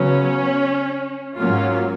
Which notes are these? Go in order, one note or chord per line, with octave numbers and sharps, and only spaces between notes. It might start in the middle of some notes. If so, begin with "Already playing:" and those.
Already playing: C#3 F#3 B3 C#4
G#2 F#3 A#3 C#4 F4